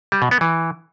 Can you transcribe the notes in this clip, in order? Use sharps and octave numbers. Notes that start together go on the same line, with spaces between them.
G3
B2
B3
E3